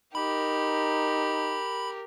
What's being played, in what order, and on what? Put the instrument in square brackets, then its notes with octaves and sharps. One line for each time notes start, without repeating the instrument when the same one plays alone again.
[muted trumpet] D#4 [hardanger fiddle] G4 A#4 [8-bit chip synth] B5